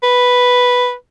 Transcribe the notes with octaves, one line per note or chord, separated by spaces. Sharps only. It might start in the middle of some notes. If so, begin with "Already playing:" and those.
B4